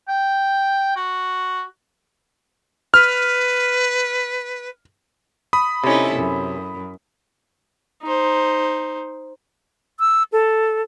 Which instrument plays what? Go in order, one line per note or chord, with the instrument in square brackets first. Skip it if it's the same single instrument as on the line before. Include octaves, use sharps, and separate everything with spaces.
[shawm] G5
F#4
[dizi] B4 [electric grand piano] F6
[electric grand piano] B5 D#6
[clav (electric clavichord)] C3 C#4 [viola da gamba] D#4 E4 A4
[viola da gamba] F#2
[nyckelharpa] D#4 C5
[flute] E6
A4